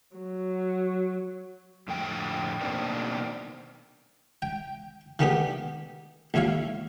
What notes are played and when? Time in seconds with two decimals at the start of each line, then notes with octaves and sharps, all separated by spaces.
0.16 F#3
1.88 F2 A2 D3 G5
2.61 B2 D#3 A#3 C4 D4
4.42 G5
5.19 D#3 G#3 A3 B3 D4 G4
6.34 A#1 D#2 E4 C#5 F5